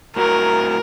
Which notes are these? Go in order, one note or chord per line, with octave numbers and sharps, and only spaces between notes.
A2 F#4 A#4 A#5